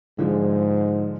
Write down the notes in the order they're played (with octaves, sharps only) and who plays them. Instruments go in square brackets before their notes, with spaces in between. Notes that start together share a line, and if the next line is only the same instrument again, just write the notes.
[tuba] G#2 [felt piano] D3 F3 G#3